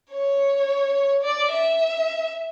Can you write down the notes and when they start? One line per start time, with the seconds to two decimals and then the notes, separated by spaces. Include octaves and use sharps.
0.11 C#5
1.24 D5
1.52 E5